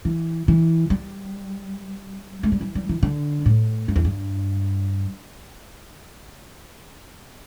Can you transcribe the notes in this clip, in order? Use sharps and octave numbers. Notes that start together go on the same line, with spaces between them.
E3
E3
G3
A3
G3
E3
G3
E3
D3
A2
G2
E2
G2